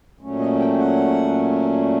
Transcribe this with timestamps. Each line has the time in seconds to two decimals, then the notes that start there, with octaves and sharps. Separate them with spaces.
0.21 A#2 F#3 A3 C#4
0.40 D#5
0.59 G5
0.78 F#5